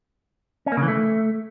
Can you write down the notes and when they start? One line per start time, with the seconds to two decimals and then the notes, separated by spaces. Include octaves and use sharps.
0.66 C#4
0.72 A#3
0.77 C#3
0.83 E3
0.88 A3